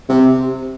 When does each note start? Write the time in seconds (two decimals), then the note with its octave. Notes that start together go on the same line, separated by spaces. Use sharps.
0.09 C3